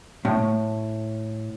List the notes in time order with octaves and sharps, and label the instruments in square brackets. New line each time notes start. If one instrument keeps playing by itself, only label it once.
[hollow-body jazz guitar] A2